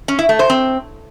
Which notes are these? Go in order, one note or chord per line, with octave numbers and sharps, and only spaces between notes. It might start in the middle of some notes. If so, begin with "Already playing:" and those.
C#4
E4
A3
C5
C4